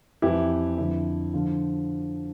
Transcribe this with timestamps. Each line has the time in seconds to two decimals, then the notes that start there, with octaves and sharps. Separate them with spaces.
0.22 F2 E3 E4 G4
0.78 F2 D3 F3 E4
1.34 D3 F3 F4